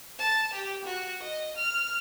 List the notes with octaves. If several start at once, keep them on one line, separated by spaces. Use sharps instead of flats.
A5
G4
F#4
D#5
F6